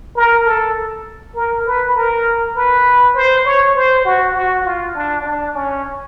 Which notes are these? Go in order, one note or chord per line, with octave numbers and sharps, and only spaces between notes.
A#4
A4
A#4
B4
A#4
B4
C5
C#5
C5
F#4
F#4
F4
D4
D4
C#4